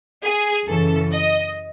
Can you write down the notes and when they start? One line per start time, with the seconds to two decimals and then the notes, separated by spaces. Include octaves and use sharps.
0.23 G#4
0.67 F#2 C#3 E3 A4
1.11 D#5